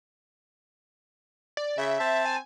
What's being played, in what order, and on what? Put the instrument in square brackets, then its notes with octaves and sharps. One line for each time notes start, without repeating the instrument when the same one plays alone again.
[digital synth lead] D5
[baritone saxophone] C#3 [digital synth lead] E5
[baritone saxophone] C4 [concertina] A5
[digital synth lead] G#5